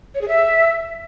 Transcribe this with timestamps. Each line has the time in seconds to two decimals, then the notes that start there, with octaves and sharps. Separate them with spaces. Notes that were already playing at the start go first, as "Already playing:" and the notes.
0.15 C#5
0.21 G#4
0.28 E5